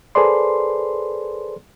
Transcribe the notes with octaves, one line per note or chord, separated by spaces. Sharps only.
G#4 A4 B4 C5 D5 C6